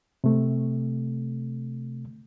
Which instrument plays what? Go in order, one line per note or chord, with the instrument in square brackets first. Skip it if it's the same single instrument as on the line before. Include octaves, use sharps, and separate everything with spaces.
[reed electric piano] C3 A3